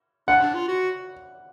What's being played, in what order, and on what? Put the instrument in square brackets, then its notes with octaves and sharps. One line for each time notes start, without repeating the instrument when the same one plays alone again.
[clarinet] D4 [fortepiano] F#5
[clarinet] D4
F4
F#4